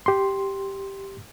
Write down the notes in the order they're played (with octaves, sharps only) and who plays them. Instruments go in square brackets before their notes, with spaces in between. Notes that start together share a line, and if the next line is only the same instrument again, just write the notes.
[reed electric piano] G4 C6